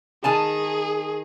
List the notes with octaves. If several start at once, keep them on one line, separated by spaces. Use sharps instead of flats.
D#3 G#4 G#5 A5